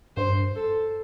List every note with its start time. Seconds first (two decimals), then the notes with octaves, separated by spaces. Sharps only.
0.17 G2 C5
0.56 A4